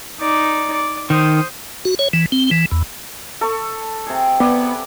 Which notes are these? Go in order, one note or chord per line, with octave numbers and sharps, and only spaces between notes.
D#4 D5
D5
D#3 C5 D#6
F#4
C#5
E3
C4
E3
E2
A4 C#6
C3 G#4
B3 D5